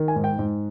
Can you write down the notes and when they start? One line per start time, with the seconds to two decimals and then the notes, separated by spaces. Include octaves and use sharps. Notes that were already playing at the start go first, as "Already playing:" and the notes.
Already playing: D#3
0.08 G#5
0.16 G#2
0.24 G5
0.39 G#2